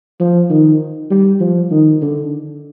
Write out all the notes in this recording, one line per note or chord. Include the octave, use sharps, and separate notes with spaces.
F3
D#3
G3
F3
D#3
D3